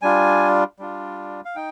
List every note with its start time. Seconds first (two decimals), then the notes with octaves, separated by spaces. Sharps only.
0.02 G3 D4 F4 G#5
0.79 G3 D4 F4
1.45 F5
1.56 D#4 G5